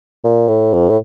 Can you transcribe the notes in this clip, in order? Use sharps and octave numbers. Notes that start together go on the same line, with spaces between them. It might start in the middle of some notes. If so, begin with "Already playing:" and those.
A#2
A2
F2
A2